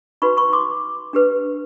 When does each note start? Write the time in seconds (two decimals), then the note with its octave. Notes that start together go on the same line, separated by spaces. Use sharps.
0.22 D#4 F#4 B4 B5 C#6
0.37 B5 C#6
0.53 C6 D6
1.13 D4 G4 B4